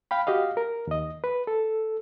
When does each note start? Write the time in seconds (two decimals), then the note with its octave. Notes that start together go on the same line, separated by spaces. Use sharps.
0.11 F5 G5 B5
0.27 F#4 G4 D#5 F5
0.57 A#4
0.87 D#2 D#5
1.24 B4
1.47 A4